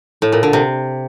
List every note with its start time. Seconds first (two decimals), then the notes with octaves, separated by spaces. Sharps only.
0.22 A2
0.32 A#2
0.43 D3
0.53 C3